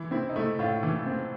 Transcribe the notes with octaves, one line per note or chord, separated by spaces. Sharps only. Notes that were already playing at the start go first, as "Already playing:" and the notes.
Already playing: E3
C4 E4
D#4
A3 E4
A2 F4
E3
C4